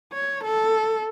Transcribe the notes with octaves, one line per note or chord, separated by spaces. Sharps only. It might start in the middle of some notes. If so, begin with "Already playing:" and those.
C#5
A4